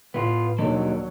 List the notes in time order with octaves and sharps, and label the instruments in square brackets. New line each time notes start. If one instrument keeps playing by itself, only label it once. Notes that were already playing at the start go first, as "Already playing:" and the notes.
[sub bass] A2 [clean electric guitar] B3 F4
[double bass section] D#2 F#3 [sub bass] B2 [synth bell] F3 [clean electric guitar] A#3 D4 D#4